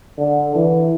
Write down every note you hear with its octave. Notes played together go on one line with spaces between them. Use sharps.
D3
E3